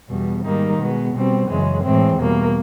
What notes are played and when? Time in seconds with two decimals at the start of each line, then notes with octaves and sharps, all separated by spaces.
0.08 E2 B2 G3
0.43 G#2 D#3 G3 A#3 D#4
0.78 B2 G#3 B3
1.13 B2 G3 C4
1.47 F#2 C#3 E3 G#3
1.82 A2 E3 G#3 C4
2.16 E2 B2 G3 A#3